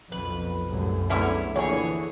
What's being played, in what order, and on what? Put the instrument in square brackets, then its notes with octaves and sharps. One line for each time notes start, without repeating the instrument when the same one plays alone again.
[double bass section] B1 F2 [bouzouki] B4
[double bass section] C2 F#2 A2
[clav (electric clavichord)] E2 D3 E3 [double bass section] A3 [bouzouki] C#4 E4
[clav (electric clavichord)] A#1 [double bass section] D3 E3 [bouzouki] G#4 C#5